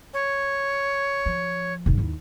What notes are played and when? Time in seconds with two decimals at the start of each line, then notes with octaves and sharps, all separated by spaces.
0.14 C#5
1.26 F3
1.86 E1 G#2
1.98 D#2 E4